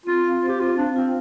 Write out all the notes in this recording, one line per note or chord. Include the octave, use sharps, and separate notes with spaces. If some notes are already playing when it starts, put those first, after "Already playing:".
C4 F4
F5
C5
G4
C4 F4
D4 F5
C4 F4